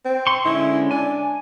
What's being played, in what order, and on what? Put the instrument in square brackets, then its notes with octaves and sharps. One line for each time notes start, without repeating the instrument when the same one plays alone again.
[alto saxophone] C4
[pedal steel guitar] C6 C#6
[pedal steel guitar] D3 G#3 C#4 [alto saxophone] E4
[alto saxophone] D4 [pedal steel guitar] G#5